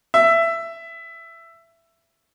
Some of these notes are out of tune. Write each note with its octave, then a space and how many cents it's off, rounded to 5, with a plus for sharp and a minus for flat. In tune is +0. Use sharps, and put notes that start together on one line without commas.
E5 +15